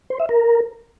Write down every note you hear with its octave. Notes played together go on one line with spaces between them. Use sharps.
C5
E5
A#4